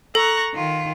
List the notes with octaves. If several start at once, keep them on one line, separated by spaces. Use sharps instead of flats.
A4 A#5 C#6 F#6
D#3 F4